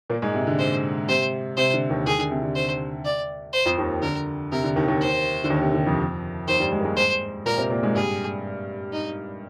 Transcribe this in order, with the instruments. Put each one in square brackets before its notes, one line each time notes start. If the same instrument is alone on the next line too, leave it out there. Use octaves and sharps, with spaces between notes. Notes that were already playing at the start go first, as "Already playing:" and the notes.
[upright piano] A#2 A#3
G#2 G#3
C3
D3
[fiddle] C5
[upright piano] C3 [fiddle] C5
[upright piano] C3 [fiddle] C5
[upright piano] D3
D#2 D#3
[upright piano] D#2 D#3 [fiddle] G#4
[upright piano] D3
C3
D3
[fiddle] C5
D5
C5
[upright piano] F2 F3
D#2 D#3
[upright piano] D3 [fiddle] A#4
[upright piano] C3 [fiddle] A#4
[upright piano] D3
D#2 D#3
D#2 D#3
[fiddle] C5
[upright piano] D3
D#2 D#3
C3
D3
F2 F3
[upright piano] D#2 D#3 [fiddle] C5
[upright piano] G2 G3
G#2 G#3
A#3
G#2 G#3
[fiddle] C5
[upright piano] A#2 A#3 [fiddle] A#4
[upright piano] C3 C4
A#2 A#3
G#2 G#3
[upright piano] G2 G3 [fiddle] G#4
[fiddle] D#4